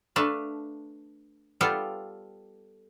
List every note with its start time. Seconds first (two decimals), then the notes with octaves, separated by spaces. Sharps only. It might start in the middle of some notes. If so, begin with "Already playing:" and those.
0.16 A3 D4 B4 F5 A5
1.61 G3 B3 F4 A4 F5 G5